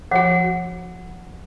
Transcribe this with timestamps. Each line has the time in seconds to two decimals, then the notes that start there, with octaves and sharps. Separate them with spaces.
0.11 F3 F#4 F#5